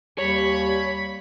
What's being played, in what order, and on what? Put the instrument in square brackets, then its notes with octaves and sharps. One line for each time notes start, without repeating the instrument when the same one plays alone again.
[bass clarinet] D#2 [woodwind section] G3 [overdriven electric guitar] C#5 [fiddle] B5